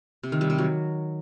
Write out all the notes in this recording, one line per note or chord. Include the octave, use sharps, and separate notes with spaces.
C3
D#3
G3
C3
F#3